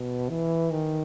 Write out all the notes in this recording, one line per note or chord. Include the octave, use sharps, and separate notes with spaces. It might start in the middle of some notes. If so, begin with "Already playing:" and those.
Already playing: B2
E3
D#3